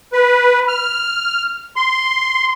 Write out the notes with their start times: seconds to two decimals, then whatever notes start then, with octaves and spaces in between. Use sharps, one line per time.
0.13 B4
0.68 F6
1.76 C6